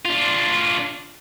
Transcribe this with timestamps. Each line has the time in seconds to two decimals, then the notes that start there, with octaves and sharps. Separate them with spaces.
0.05 D4 F4